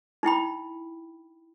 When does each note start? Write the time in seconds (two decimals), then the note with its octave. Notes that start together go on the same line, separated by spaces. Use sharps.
0.23 D#4 E4 G5 B5